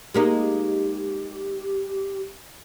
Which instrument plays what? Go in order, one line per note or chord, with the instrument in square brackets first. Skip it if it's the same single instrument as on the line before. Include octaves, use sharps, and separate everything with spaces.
[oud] G#3 A#3 D#4 [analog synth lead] G4